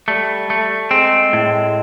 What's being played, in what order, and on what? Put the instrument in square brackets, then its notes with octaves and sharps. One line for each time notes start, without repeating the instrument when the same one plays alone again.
[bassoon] G3 [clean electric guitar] A3
[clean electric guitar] A3
[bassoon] G#3 [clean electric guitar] C4
[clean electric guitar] A2